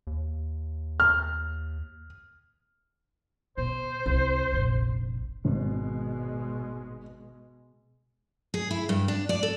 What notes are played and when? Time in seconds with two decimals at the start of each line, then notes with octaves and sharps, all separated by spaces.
0.07 D#2
1.00 F6
3.57 B2 C5
4.06 C2
4.53 F1 A#1
5.45 G#1 B2 G#3
8.54 G#4
8.71 E4
8.89 G2
9.08 D4
9.29 D5
9.43 A4